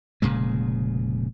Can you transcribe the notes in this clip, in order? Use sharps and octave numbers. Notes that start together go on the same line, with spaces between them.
F1 A#2 C#3 G#3